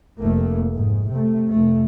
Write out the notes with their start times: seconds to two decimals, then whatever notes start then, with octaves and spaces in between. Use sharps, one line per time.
0.20 F1 A3 A#3
0.74 G#2
1.11 C3 A3
1.52 F1 A3